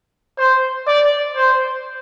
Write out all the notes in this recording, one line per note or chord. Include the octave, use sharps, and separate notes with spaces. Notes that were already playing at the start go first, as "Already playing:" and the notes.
C5
D5
C5